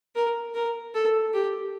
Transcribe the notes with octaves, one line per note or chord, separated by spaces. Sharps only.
A#4
A#4
A4
G4